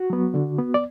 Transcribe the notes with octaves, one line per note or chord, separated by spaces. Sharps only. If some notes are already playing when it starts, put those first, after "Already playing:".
Already playing: F#4
F#3 B3
D3
B3
D5